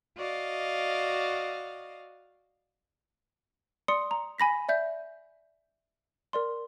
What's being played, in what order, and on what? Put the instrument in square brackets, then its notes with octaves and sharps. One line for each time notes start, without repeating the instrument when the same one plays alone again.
[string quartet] F#4 D5 D#5 F5
[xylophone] D5 C6 D#6 C#7
A#5
G#5 B5 A#6 B6
D5 E5 G6
A#4 D5 C6